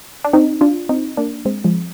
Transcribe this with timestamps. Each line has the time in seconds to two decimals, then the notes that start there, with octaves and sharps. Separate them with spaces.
0.24 D4
0.33 C4 D#4
0.61 D4 F4
0.89 C4 D#4
1.17 A#3 D4
1.45 G#3 C4
1.64 F3 G#3